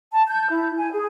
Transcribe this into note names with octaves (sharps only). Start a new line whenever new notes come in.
A5
G6
E4
G#5
G#4